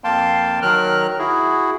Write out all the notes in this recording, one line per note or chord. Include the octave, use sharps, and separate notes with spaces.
F2 A#3 F5 G5 A5 C6
D#3 F#3 A#4 F6 F#6
E4 F#4 G#4